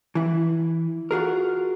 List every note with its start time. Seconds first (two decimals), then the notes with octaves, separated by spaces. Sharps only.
0.15 E3 E4
1.11 F4 F#4 G#4 A#4